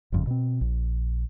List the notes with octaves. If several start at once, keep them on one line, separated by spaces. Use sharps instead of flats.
G1 F2 C#3
B2 C4
A#1